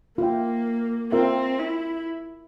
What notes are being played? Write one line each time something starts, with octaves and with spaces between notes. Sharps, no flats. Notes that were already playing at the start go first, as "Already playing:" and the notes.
A#3 F4 A#4 E5 G5
C4 F4 A#4 E5 G5
E4